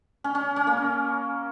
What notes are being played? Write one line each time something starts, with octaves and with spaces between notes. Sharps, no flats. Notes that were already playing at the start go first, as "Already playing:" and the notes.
C#4
C#4
C#4
A#3